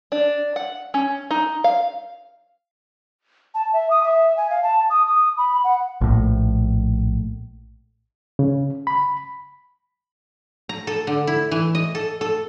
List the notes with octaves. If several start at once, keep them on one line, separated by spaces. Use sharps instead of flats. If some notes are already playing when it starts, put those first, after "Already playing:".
D4
F#5
C#4
D#4
F5
A5
E5
D#6
E5
G#5
F5
A5
D#6
D#6
B5
F#5
A#1 A2
C#3
B5
A#5
A4
D3
E4
E3
D#5
A4
A4